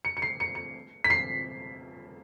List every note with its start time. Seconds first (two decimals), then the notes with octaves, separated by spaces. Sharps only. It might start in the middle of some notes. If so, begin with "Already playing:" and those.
0.05 C#7
0.17 C#7
0.22 C7
0.40 C#7
0.55 C#7
1.04 B6
1.10 C7